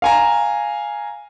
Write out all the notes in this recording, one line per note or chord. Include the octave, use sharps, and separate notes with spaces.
F5 G#5 A#5